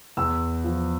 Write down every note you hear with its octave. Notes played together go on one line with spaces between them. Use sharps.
E2 E6
F3